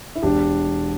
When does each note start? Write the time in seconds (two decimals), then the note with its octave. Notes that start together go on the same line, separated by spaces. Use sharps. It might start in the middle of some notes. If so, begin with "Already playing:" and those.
0.15 E4
0.23 E1 D4 G4